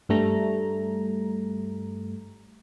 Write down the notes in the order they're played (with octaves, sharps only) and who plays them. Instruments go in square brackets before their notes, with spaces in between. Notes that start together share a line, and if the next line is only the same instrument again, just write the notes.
[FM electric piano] G2 G3 A3 A#5